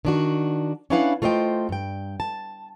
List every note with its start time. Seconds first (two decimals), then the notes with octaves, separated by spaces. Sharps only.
0.05 D#3 D4 F#4
0.90 C#4 D4 E4 B4 F5 F#5
1.22 A3 F4 C5 D#5 G5
1.69 G2 G5
2.20 A5